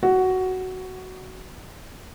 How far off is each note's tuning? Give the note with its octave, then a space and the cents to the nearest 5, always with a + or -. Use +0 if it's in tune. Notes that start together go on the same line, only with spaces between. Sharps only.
F#4 +10